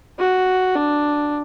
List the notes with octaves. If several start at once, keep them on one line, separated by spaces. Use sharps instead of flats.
F#4
D4